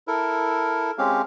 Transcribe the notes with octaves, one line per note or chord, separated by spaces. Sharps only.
E4 A4 A#4
G#3 C4 C#4 G4 F5